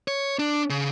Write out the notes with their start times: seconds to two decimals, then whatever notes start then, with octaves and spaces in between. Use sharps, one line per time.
0.08 C#5
0.39 D4
0.70 C#3